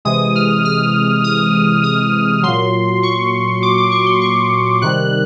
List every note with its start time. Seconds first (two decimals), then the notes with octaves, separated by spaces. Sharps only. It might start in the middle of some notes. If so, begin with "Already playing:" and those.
0.05 C3 E3 G#3 D#6
0.35 F6
0.65 F6
1.24 D#6
1.84 D#6
2.43 A#2 F#3 C6
3.03 C#6
3.63 D6
3.78 D6
3.91 C#6
4.06 C6
4.22 C#6
4.82 C3 D#3 G3 F#6